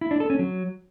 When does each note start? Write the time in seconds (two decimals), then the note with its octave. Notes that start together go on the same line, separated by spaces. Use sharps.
0.01 E4
0.11 D4
0.20 A4
0.30 C#4
0.39 F#3